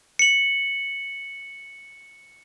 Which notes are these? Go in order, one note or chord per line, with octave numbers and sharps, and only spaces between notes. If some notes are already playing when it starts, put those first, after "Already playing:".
C#7 F#7